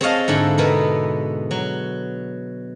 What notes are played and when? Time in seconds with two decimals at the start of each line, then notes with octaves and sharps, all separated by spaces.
0.01 C4 G#4 C#5 D#5 F5 A5
0.28 G#2 D3 E4 A4
0.58 B2 B3 A#4
1.51 F#3